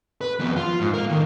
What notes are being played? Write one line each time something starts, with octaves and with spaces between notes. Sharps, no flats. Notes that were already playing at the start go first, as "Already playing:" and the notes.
B4
F2 B3
F4
G#2
A#4 F5
D3 D#3